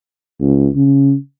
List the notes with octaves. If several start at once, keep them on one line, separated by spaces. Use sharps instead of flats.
C#2
C#3